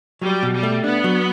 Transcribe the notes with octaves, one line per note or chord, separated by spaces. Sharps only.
F#3 G3
B2
G3
A3
B3 D4
F#3